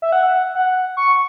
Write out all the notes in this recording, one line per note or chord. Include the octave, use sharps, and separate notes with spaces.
E5
F#5
F#5
C#6